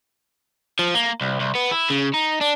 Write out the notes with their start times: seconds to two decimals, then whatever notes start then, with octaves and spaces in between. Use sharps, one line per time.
0.79 F3
0.94 A#3
1.21 C2
1.40 C2
1.55 B3
1.71 E4
1.90 C#3
2.14 D#4
2.41 D4